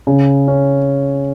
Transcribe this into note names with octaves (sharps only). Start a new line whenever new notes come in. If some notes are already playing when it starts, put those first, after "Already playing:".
C#3
C#4